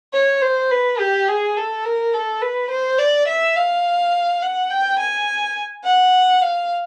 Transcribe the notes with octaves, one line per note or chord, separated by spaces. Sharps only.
C#5
C5
B4
G4
G#4
A4
A#4
A4
B4
C5
D5
E5
F5
F#5
G5
G#5
F#5
F5